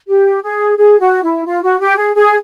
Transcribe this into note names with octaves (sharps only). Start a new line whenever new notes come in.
G4
G#4
G#4
F#4
E4
F4
F#4
G4
G#4
G#4